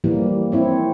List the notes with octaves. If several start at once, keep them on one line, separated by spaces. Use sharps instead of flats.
E3 F3 G3 A#3
C4 E4 C#5